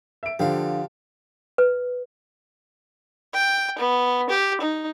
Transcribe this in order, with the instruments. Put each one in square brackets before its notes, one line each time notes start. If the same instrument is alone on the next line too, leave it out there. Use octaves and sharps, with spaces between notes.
[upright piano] E5 D7
[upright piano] D3 F3 [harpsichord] G4 F5
[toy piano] B4
[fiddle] G5
B3
G4
D#4